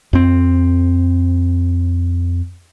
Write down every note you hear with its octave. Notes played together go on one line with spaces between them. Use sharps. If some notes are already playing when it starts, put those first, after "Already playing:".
F2 C4